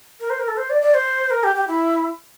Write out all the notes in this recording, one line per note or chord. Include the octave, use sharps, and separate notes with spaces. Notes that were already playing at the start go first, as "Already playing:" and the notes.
A#4
C5
A#4
A4
C5
D5
D5
C5
A#4
G4
G4
E4